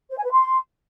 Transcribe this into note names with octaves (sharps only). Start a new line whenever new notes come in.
C5
G#5
B4
C6